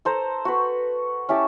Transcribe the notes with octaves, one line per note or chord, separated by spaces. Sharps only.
A4 C5 A#5
F#4 B4
C#4 E4 G4 A5